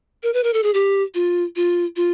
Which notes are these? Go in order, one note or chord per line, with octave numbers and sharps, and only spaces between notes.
A#4
B4
A#4
A4
G#4
G4
F4
F4
F4